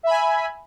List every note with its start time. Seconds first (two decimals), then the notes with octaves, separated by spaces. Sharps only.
0.03 E5
0.07 B5
0.10 G#5